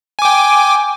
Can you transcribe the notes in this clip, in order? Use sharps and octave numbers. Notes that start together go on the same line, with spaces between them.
G5 G#5 D6